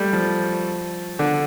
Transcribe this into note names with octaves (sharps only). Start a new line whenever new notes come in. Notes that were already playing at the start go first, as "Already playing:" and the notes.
Already playing: G3 A3
F3
D3